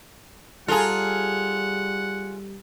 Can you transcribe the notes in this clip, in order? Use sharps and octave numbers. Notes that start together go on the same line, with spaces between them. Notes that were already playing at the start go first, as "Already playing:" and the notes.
G3 F4 G#4 A4 F#5 A#5